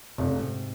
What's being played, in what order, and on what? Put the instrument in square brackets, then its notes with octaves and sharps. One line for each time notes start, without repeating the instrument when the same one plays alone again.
[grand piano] F1 [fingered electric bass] C3
[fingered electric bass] C#3
G#2 C3